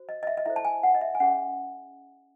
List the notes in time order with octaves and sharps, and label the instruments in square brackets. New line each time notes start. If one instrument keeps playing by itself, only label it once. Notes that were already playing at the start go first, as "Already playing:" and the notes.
Already playing: [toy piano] F#4 C5
D#5
D#5
E5
D#5
E4 A4 C5 E5
A5
G#5
F#5
D#5
E5
G#5
C#4 G#4 C#5 F#5